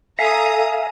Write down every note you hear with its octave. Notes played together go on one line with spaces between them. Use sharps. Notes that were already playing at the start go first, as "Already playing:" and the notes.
A4 E5 F5 G#5 A#5 D#6